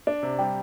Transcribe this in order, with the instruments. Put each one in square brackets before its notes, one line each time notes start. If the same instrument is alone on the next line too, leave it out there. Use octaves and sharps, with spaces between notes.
[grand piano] D4
C3
[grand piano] G3 [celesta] G5